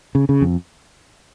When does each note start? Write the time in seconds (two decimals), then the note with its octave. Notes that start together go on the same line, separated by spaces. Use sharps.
0.15 C#3
0.29 C#3
0.41 F2